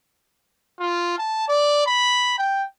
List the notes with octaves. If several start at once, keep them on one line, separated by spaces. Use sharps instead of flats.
F4
A5
D5
B5
G5